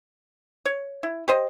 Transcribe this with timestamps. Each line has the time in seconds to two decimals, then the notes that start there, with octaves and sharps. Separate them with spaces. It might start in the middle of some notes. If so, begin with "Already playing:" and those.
0.65 C#5
1.03 E4
1.28 G4 C5 D#5